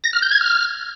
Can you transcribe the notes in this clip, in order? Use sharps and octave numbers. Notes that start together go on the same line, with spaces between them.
A#6
F6
G6
G#6
F6